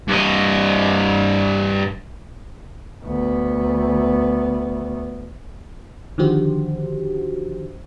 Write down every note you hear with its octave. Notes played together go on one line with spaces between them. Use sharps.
G2 D#5
D2 B3
D3 D#3 F3 F#4 G4 C5